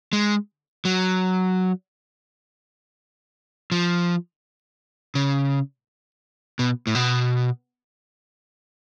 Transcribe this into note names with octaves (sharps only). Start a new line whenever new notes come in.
G#3
F#3
F3
C#3
B2
A2
B2